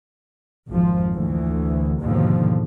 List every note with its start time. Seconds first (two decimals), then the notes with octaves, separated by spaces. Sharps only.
0.67 G#1 F2 F3
1.13 D2 E3
2.02 D#2 G#2 B2 D3 F3